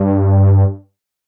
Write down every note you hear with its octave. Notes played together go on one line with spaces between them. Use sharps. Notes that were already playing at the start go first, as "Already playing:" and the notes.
Already playing: G2